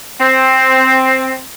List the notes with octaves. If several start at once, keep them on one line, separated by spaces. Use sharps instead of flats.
C4